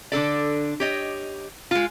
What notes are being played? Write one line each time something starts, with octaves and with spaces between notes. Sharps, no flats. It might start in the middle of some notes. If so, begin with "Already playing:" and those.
D3 D4 A4 D5
G4 C#5 D#5
G#3 F4